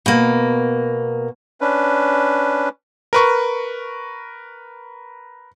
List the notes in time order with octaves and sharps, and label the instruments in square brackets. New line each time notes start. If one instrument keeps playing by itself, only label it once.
[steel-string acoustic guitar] B2 A#3
[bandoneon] C#4 D4 B4
[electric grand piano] A#4 B4 C#6